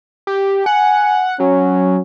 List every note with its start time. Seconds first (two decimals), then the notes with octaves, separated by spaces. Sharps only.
0.27 G4
0.66 F#5 G#5
1.40 F#3 C#4